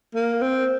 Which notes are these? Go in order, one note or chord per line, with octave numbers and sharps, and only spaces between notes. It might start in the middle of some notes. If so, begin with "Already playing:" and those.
A#3
C4